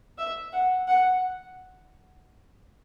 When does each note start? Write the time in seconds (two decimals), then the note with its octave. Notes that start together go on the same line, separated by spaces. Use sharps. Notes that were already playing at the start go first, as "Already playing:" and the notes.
0.18 E5
0.53 F#5
0.88 F#5